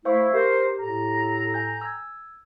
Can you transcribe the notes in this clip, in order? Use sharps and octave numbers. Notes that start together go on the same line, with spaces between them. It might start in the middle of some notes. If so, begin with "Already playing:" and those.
A3 E4 C5 F5 C#6
G4 A#4 C5
A2 A4 A#5
G5 G#5 G6
E6 G#6